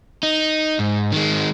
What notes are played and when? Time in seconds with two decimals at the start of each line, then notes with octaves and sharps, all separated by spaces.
0.23 D#4
0.79 G#2
1.12 D#3 G#3